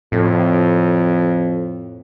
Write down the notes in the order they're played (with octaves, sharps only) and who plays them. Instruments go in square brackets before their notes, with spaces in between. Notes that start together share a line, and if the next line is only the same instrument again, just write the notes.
[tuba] F2 [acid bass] A2